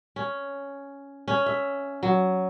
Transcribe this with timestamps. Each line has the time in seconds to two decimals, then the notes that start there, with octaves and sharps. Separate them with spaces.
0.16 C#4
1.28 C#4
1.46 E5
2.03 F#3